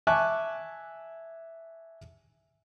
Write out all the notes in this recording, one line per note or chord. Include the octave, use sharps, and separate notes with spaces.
E5 G#5 A5 C#6 D6 F#6